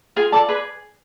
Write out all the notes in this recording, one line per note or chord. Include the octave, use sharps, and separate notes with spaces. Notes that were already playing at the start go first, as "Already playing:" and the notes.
F4 G#4 G#5
A4 D5 A5
G#4 B4 B5